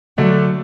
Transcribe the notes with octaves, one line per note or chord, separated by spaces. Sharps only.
D3 F#3 A3 D4